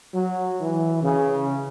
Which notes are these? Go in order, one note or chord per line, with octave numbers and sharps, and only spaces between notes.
F#3
E3
C#3